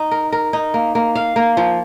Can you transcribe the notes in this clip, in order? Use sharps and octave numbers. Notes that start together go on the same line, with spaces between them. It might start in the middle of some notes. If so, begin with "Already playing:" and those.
Already playing: D#4
A#4
A#4
D#4
A#3
A#3
F5
A#3
F3